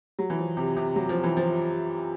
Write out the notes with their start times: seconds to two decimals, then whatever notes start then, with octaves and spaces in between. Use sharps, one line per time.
0.19 F#3
0.30 E3
0.39 F3
0.57 C3
0.77 C3
0.96 F#3
1.09 F3
1.23 E3
1.37 F3